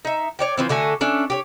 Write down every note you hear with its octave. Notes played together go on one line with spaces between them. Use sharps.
D#4 E5
C#5 D5 G5
E3 F3 C4
D3 A3 F#4 G#5
A3 C#4 D4 E5
G4 G#4 C#5